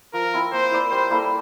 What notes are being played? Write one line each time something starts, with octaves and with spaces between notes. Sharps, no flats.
F3 A#4
C4 E4
A#3 C5
E4 A#4 D5
G3 C5
A#3 E4 A4